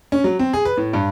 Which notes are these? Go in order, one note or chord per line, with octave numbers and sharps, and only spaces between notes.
C#4
F#3
C4
G#4
B4
A2
G2